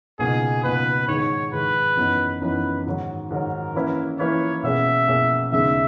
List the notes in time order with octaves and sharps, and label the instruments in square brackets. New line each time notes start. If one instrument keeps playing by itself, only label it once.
[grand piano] C#2 B2 A#3 D#4 [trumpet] G#4
[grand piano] C#2 B2 A#3 D#4 [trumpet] B4
[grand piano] G#2 D#3 G#3 [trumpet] C#5
[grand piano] G#2 D#3 G#3 [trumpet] B4
[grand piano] F#2 E3 B3 D#4
[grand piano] F#2 E3 B3 D#4 [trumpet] B4
[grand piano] G#2 D#3 F#3
[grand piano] G#2 D#3 F#3 [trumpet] A#4
[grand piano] E3 A#3 C#4 E4 B4
[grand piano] E3 A#3 C#4 E4 B4 [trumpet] C#5
[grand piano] B2 A#3 C#4 G#4 [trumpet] E5
[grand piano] B2 A#3 C#4 G#4
[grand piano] D#2 C#3 G#3 B3 D#4 [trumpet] E5